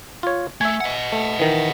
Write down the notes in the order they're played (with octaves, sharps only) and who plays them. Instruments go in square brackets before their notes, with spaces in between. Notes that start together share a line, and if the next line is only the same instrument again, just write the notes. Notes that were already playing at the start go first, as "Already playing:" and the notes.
[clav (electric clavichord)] F4 C#5
[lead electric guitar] A3 [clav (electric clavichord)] E5 G#5
[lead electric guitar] D#5 F#5
[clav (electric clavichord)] A3
D#3 E3